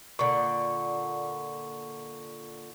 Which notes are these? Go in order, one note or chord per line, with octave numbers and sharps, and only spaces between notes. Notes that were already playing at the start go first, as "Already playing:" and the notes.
A#2 D3 C#6